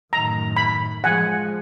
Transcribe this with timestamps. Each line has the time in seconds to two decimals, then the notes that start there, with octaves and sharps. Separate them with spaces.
0.13 F#2 A2 D#3 A#5
0.56 B5
1.04 F3 G#3 F#5 G#5